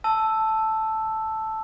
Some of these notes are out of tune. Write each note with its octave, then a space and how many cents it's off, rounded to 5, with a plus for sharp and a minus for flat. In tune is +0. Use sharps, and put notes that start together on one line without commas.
A5 +0 E6 +0